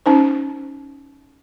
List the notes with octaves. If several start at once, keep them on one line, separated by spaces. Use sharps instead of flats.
C#4 D#4 C5